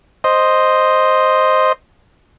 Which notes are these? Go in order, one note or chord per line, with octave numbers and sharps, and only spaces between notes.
C5 D#5